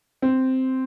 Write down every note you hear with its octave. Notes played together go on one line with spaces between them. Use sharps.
C4